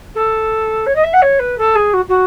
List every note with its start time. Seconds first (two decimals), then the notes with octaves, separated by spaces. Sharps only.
0.15 A4
0.86 C#5
0.95 D#5
1.03 E5
1.13 F#5
1.22 C#5
1.39 B4
1.58 A4
1.75 G#4
1.93 F#4
2.08 F#4